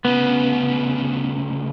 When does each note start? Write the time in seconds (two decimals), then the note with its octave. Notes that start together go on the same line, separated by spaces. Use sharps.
0.05 D2 C#3 B3